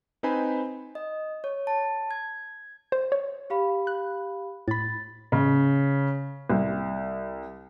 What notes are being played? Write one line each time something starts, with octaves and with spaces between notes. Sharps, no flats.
C4 D#4 B4 C5 G#5 B5
D#5
C#5
A5
G#6
C5
C#5
G4 F5 B5
F#6
A2 B5 A6
C#3
C2